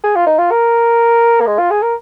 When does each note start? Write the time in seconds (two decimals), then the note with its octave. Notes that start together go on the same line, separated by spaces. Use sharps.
0.04 G#4
0.16 F4
0.27 D#4
0.39 F4
0.51 A#4
1.41 A#3
1.47 G#3
1.58 F4
1.71 G#4
1.82 A#4